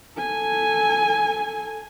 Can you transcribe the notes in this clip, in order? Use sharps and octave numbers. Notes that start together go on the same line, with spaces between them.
A4 G#5